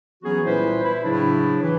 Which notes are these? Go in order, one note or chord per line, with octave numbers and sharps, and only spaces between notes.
E3 F#3 B3 C#4 F#4 G#4
C2 A#2 E4 B4 C5
E4
A2 C#3 F#3 D4 E4
E3